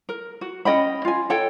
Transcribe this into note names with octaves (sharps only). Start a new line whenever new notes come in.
A#4
F#4
C#4 D#5 G5 B5
F4 G#5
A4 C#5 G5